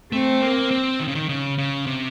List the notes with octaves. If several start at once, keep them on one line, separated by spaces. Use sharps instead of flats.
A3 C4
A#3
C4
D#3
C#3
D#3
C#3
C#3
C3